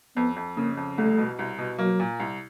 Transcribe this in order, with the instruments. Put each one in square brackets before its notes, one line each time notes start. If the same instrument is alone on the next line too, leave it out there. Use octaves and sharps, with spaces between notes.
[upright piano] F2 [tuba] B3
[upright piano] F2
[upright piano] C#3 [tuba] A#3
[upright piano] F2
[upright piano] C2 [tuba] A3
[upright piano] B2
C2
B2
[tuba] F#3 [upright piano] A#3
[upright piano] A#2
C2